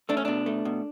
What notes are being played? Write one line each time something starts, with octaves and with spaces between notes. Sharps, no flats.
A3 D4
C#4
B2 D4
A3
B2